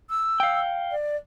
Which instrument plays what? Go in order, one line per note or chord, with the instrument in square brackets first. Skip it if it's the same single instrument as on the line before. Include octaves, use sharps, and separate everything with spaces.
[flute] E6
[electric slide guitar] F5 G5
[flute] D5